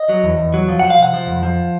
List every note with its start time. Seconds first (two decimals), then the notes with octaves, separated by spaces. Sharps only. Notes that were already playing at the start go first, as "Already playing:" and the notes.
Already playing: D#5
0.09 F#3
0.24 E2
0.38 E2
0.54 F#3
0.69 F3
0.79 F3 F#5
0.90 F5
0.99 C3 F#5
1.14 F3
1.27 F2
1.43 F3